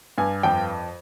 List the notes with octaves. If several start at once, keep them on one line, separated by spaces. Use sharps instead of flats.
G2 G#5
F2 G5